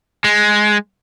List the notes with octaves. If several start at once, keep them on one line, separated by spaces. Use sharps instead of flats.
G#3